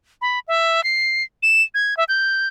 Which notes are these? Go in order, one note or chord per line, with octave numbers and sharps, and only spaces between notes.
B5
E5
C7
E7
G#6
E5
G6